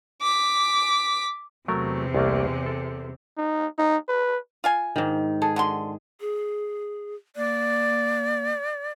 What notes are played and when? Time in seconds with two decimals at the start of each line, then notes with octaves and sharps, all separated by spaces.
0.22 D6 B6
1.68 E2 C3 F#3 A3 A#4
2.15 C2 A3 A#3
2.66 A4
3.37 D#4
3.78 D#4
4.09 B4
4.64 F4 F5 G#5
4.96 G#2 D#3
5.42 G#4 A4
5.56 D3 F#4 C6
6.20 G#4
7.36 A#3 D5